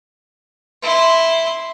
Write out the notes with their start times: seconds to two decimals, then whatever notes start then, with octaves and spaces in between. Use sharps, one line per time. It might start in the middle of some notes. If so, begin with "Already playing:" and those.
0.82 E4 C6